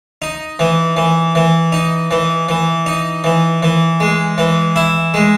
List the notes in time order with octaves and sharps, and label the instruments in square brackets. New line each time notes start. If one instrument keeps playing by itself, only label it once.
[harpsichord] D#4
E3
E3
E3
D#4
E3
E3
D#4
E3
E3
G#3
E3
E4
G#3